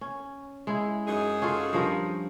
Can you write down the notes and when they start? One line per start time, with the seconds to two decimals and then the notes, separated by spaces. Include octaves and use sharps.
0.01 C#4
0.67 G#3 E4
1.06 F#2 D#4 G#4
1.42 C#4 F4 A4
1.73 G2 F3 A#4